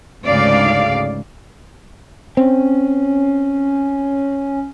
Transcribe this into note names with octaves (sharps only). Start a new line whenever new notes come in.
D2 G#2 C#3 D5 F5
C4 C#4